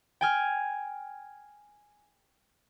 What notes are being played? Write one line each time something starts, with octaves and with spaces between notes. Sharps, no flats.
G5 G#5 F6